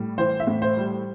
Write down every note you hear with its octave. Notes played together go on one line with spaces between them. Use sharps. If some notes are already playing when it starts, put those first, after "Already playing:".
Already playing: A2 G3
E3 C5
E5
A2
C5
G3